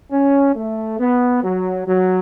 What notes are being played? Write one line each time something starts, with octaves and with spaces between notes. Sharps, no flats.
C#4
A3
B3
F#3
F#3